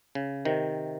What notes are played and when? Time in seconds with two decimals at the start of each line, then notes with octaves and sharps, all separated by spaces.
0.15 C#3
0.45 C3 D#3